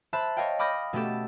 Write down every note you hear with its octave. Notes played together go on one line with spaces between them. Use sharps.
C5 E5 A5 B5 F#6
C#5 D#5 F5 G5
B5 D6 D#6 F6 G6 A#6
B2 A3 B3 C#4 G4 A4